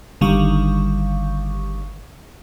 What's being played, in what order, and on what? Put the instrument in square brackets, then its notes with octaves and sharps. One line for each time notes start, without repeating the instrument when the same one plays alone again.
[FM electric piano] G1 D3 D#3 G3 F5 C#6